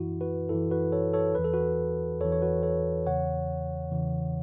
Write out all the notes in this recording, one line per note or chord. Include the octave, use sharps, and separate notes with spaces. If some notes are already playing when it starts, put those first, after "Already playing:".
Already playing: F#2 E3 E4 F#4
F#4 B4
F#2 E3 E4 A4
F#4 B4
A4 C#5
A4 C#5
E2 E3 B4
A4
F#4 B4
E2 E3 A4 C#5
C#5
F#4 B4
A4 C#5
E2 C#3 E3 C#5 F#5
E2 C#3 E3